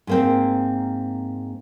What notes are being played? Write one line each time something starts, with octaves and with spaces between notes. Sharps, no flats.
G#2 A#3 C4